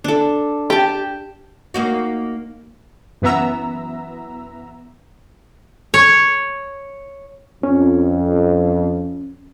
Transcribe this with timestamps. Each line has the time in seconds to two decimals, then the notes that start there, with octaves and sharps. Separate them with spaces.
0.04 D4 A4
0.70 G4 G5 A5
1.74 A#3 D#4 F#4
3.22 F#2 E3 B3 E5 A#5 E6
5.94 C#5
7.63 F2 C#4